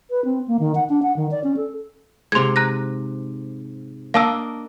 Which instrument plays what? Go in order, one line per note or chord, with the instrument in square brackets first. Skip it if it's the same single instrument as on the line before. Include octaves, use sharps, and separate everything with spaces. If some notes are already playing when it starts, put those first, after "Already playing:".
[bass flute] B4
C4
A#3
D#3
F#5
D4
F#5
D#3
D5
C#4
A4
[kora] G#2 C3 [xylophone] C6 G#6
[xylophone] A#5 F#6 A#6
[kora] A#3 D4 D#5 [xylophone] F5 A5 E6